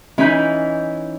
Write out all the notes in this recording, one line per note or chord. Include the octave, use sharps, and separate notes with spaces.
E3 C#4 D#4 B5 G6